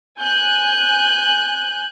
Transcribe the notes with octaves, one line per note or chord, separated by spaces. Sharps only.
G#5 F#6 G6